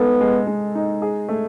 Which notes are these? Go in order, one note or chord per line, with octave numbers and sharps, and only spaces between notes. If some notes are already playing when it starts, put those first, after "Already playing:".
Already playing: G#3 B3 D#4 A4
G#3
G#3
D#4
G#4
A3